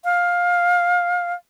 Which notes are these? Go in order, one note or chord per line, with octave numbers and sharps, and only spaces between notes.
F5